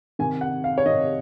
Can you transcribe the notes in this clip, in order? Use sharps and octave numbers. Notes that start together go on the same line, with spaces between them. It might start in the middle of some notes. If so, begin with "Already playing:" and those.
C3 D#3 G#5
F#5
F5
C#5
C3 D#3 D#5